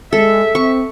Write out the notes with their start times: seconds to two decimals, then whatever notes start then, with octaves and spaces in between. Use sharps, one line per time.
0.13 G#3 A4 E5
0.55 C4 C#6